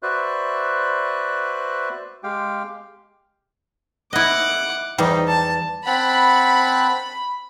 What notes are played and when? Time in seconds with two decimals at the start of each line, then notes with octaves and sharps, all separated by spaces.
0.03 F#4 B4 C5 D5 E5 F#6
2.23 G#3 G4 F5 G5
4.13 E4 D#5 F#5 D6
4.98 E2 G3 D#4
5.28 A5
5.86 C4 F#5 A5 B5